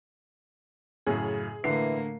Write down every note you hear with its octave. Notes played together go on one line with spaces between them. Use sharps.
F#2 A2 C#3 G#4
A2 D3 E3 A#3 C7